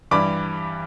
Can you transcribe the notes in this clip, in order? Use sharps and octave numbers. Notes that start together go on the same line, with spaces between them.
G2 E3 G3 B5 D6